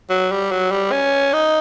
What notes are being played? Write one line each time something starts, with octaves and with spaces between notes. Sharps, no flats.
F#3
G3
F#3
G3
C#4
D#4